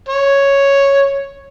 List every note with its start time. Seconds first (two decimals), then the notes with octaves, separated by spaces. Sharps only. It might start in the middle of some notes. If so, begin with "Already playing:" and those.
0.09 C#5